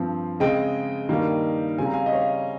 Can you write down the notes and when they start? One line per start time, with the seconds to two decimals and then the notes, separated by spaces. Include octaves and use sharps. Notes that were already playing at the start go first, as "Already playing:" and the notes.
Already playing: G2 F3 C4
0.40 C#3 G#3 C4 D#5 G5
1.09 G2 D#3 G3 A#3
1.78 C#3 G3 C4 G#5
1.86 A#5
1.94 F5 G#5
2.06 D#5
2.13 C#5 F5